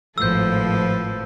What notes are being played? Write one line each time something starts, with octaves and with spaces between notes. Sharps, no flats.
G#1 A2 F3 A4 B4 C5 E6 G6